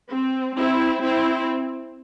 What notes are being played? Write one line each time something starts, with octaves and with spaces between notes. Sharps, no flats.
C4
C4 E4
C4 E4